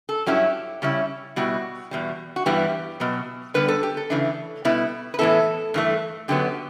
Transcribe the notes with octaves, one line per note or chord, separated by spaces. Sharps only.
A4
G2 F#3 C#4 E4 G4
C#3 G3 C#4 E4
B2 G3 B3 E4 F#4
E2 B2 G3
F#4
G2 E3 G3 B3 G4
B2 F#3 B3
D3 G3 B3 B4
A4
G4
A4
C#3 E3 A3 D4
B2 G3 B3 E4
B4
A2 E3 B3 E4 A4
G2 E3 A3
F#2 D3 F#3 B3 G4